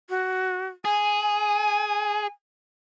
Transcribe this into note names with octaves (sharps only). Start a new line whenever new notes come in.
F#4
G#4 G#5